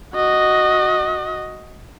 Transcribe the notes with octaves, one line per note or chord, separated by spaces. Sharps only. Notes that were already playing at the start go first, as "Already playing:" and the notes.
F#4 D#5